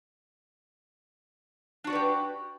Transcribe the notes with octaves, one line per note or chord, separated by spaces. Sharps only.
D4 F#4 G4 B4 D5